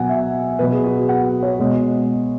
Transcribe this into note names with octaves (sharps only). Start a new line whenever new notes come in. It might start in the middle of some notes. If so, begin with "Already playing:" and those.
Already playing: B2 F#3 F#5 G#5
E5
B2 F#3 B4
G#4
F#4
G#4
F#5
C#5
B2 G#3